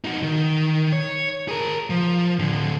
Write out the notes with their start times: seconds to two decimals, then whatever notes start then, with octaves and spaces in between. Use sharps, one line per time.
0.04 D#4 F#4
0.22 D#3
0.92 C#5
1.48 G#4 A#4
1.90 F3
2.39 A2 D3